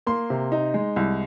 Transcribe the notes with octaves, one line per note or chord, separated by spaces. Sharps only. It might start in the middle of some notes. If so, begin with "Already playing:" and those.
A#3 C6
C3
D#4
G#3
C2